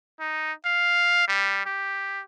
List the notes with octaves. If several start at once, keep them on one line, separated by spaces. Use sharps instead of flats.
D#4
F5
G3
G4